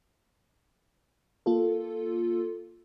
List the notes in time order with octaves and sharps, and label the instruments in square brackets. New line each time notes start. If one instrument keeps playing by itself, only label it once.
[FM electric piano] A#3 F4 A4